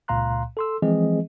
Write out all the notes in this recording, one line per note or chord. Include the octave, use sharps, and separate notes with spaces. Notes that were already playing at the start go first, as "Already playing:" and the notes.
C#2 A#2 F5 A#5 C6 F#6
A4 C6 E6
E3 F3 G#3 C4 G#4 D#5